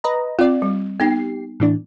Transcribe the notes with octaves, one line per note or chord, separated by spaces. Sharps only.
B4 D#5 A#5
C4 F4 D5
G3
B3 D#4 G4 C7
A2 E3 D4